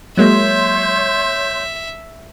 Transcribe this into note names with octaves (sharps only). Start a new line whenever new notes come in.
F#3 G#3 A#3 C#5 E5 C6 G6